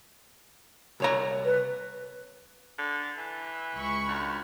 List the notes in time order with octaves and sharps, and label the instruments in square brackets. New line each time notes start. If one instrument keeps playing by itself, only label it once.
[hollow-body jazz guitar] C2 C#5 A#5
[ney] B4
[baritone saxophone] D3
E3
[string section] C#2 B5 C#6
[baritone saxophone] D2